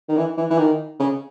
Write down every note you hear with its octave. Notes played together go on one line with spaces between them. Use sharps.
D#3
E3
E3
E3
D#3
C#3